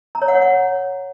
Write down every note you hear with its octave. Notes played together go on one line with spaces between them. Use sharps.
A#5
C#5
F#5
C#5
F#5